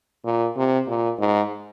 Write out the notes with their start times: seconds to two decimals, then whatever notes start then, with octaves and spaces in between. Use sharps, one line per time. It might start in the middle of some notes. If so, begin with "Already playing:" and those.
0.25 A#2
0.56 C3
0.88 A#2
1.20 G#2